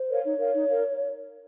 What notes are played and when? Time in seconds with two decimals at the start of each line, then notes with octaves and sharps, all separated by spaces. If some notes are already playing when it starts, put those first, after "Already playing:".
Already playing: C5
0.09 A#4 C#5 F5
0.23 D#4 C#5
0.38 A#4 F5
0.53 D#4
0.68 A#4 F5